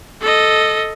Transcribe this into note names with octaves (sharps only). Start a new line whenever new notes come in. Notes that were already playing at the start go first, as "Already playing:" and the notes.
A4 D#5